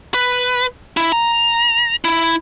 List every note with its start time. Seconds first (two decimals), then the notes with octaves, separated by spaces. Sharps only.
0.14 B4
0.97 E4
1.12 A#5
2.05 E4